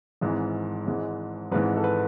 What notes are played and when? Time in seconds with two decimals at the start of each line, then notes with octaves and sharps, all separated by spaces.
0.21 G#1 G#2 E3
0.86 G#1 G#2 E3 G#3
1.52 G#1 G#2 E3 B4
1.77 A4
1.84 B4